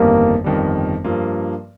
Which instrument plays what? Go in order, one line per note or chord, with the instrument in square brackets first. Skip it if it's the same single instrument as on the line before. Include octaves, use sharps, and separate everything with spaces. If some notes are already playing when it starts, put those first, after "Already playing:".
Already playing: [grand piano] G1 F2 D#3 G3 [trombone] A#3
[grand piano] G1 F2 D#3 G3
G2 F3 A#3 F4